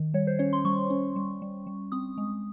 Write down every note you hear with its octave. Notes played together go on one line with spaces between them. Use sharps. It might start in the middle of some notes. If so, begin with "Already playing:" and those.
Already playing: D#3
G3 C#5
C5
C#4 C#5
C6
G3 C#6
C#4
G3
G3
G3
C4 D#6
G#3